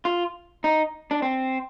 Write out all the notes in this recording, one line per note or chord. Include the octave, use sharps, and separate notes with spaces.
F4
D#4
D4
C4